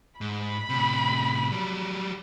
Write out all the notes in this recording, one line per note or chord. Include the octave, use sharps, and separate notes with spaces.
G#2 B5
A2 C3
F#3 G3